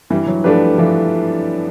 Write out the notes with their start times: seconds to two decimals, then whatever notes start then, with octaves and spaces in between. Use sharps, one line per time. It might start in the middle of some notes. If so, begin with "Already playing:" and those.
0.10 G2 E3 G3
0.27 F#3
0.44 F3 A3 D4 G4 B4
0.78 E3 F3